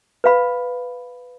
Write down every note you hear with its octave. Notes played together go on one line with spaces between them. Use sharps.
B4 F5 B5